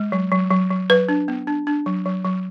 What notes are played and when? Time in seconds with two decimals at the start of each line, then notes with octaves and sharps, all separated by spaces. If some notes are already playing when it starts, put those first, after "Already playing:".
Already playing: G#3
0.12 F#3
0.32 F#3
0.51 F#3
0.71 F#3
0.90 F#3 B4
1.09 D4
1.28 B3
1.47 D4
1.67 D4
1.86 F#3
2.06 F#3
2.25 F#3